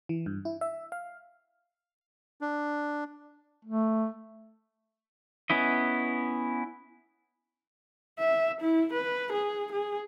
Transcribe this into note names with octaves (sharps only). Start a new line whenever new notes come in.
E3
G2
E4
E5
F5
D4
A3
B3 C#4 E4 D#5
E5
E4
B4
G#4
G#4